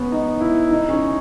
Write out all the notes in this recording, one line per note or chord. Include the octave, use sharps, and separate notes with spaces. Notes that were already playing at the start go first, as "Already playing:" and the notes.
Already playing: B3 C#4
D#4
E4
D#4
C#4